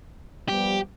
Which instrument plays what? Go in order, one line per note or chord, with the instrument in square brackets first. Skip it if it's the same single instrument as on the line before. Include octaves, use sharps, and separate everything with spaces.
[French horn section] F3 G3 B3 [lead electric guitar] G4